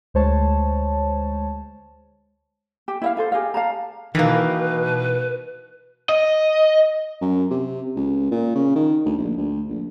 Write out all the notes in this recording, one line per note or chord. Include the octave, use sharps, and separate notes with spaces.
D2 G#3 C5 C#5 A5
G4
E4 E5 F5
F4 A4 C5
G4 G#4 D#5 F5
F5 A5 A#5
B2 D#3 E3 A#3 B4
D#5
F#2
C3
C#2
A#2
C#3
D#3
D2
A#1
D2
A#1